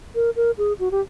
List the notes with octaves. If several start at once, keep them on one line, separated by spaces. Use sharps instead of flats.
A#4
A#4
G#4
F#4
G4